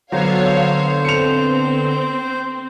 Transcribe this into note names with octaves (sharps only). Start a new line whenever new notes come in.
D3 F#3 B3 A4 C5 C#5 F5
C4 C#7 F7